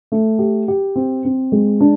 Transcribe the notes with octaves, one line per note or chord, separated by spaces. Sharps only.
A3
G4
G4
C4
C4
G#3
D4